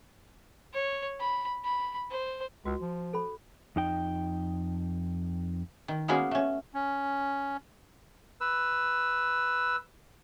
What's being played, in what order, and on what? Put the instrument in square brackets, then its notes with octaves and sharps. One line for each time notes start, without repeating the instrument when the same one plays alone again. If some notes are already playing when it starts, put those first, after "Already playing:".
[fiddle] C#5
B5
B5
C5
[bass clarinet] C#2 [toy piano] F#4
[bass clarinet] F3
[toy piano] A4 C5 B5
[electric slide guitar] F2 D#4 G5
[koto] D#3
G#3 A#3 B3 C#4 F#4 G#4
A3 C#4
[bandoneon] C#4
[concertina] B4 E6